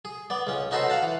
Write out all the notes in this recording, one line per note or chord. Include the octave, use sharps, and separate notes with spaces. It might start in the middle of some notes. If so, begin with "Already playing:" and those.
G#4
B3 D5
C#2 C#4
C#4 D#4 F#4 A4 B4 C5
F5 F#5 A5
E3